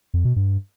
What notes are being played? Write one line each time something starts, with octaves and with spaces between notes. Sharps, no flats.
F2
B2
G2